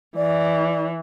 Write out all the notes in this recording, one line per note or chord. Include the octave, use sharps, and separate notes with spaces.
E3 D5